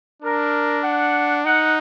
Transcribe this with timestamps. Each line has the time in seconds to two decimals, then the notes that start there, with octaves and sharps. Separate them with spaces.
0.22 D4 A#4
0.83 F#5
1.45 D#4 F#5